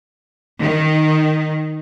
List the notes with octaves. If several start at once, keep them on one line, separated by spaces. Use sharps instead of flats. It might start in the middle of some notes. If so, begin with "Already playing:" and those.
D#3